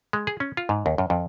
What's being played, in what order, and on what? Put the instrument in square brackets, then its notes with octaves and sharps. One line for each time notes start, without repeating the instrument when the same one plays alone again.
[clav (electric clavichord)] G#3
G#4
C#4
F4
G#2
D#2
F#2
F2